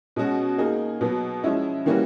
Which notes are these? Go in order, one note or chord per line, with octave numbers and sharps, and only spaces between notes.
B2 G#3 C#4 F#4
A#3 D#4 G#4
B2 F#3 B3
F3 G#3 C#4 E4
E3 G3 A#3 C#4 F#4